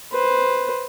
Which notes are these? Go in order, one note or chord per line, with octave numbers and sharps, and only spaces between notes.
B4 C5